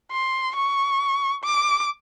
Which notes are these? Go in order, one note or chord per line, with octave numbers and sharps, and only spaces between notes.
C6
C#6
D6